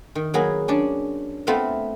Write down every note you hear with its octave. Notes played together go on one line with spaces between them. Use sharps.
D#3
F#3 A#3 B3 G#4
C#4 D4 D5
A3 B3 C4 F4 E5 F5